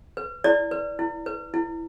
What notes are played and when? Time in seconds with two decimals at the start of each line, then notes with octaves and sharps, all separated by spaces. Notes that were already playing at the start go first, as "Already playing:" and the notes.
0.17 B4
0.44 E4 D5
0.71 B4
0.99 E4
1.26 B4
1.54 E4